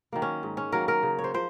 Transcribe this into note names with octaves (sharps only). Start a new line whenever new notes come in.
D#3 F#3 A#3
C#4
G#2
C#4
D#3 F#3 A#3 A#4
A#4
C#3
C#5
C5
F3 C5